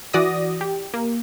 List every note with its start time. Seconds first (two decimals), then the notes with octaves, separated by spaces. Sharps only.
0.13 E3 F#4 D5 D#6 A#6
0.61 G4
0.94 A#3